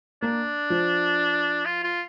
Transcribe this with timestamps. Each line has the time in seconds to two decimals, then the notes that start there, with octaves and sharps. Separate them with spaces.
0.22 A#3 D4
0.70 F3
1.66 F4
1.84 F4